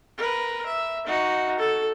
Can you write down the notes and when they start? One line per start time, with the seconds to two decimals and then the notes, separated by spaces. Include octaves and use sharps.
0.18 A#4 B4
0.66 E5
1.06 D#4 F#4
1.59 A4